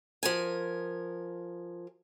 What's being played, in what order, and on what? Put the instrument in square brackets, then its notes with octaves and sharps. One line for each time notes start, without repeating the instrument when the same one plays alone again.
[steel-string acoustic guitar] F3 A#4 G#5